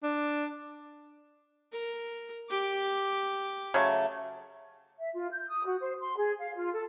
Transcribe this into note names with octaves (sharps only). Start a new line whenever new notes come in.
D4
A#4
G4 D6
C#3 F#3 A3
E5
F4
G6
D#6
F#4
C5
C6
G#4
F5
F4
A4